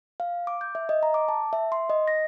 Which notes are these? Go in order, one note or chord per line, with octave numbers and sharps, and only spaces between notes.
F5
D6
G6
E5
D#5
A#5
D6
A5
E5
C6
D#5
A#6